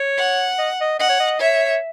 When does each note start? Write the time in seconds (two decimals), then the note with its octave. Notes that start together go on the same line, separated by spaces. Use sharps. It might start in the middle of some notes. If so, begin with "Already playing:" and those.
Already playing: C#5
0.18 F#5
0.59 D#5
0.81 D#5
0.99 D#5 F#5
1.09 C#5
1.20 D#5
1.40 C#5 E5